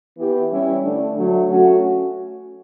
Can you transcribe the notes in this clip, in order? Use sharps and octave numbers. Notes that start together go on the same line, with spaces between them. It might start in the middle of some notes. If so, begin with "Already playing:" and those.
E3 B3 E4 G4
G3 C#4 E4
D3 A3 D4
D3 F#3 A3
A3 C#4 F#4